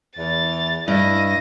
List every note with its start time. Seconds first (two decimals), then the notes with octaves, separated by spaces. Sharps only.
0.17 E2 A6
0.88 G2 E4 D#5 A#6